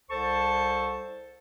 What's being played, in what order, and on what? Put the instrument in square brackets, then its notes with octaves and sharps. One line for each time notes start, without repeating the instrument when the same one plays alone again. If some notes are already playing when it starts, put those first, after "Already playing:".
[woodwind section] C2 A4 C5 A5 C#6